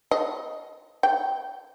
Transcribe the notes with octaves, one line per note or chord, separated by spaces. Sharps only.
D#5
G5